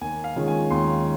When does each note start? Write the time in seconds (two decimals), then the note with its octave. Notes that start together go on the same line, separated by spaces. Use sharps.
0.01 D#2 G#5
0.24 F5
0.36 D#3 G#3 C#4 F4
0.48 G#5
0.71 D#2 C6